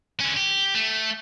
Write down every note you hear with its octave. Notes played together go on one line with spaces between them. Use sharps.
D3 C#4
G4
A3